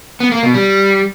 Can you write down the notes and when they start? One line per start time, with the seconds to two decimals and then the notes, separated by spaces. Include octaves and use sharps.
0.20 B3
0.32 A#3
0.43 B2
0.54 G3